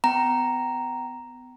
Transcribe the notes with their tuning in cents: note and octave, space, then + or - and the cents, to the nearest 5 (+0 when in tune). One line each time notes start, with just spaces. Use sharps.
B3 +35 G5 -30 A#5 +0